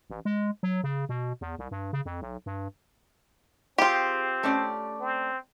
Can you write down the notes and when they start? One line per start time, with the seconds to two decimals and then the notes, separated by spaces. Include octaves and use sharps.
0.10 A1
0.25 G#3
0.63 F#3
0.83 C#3
1.09 B2
1.41 E2
1.59 C2
1.71 G2
1.93 C#3
2.06 F2
2.21 B1
2.46 G2
3.78 C4 F4 G4 G#4 G5
4.43 A3 C#4 D5
5.00 C4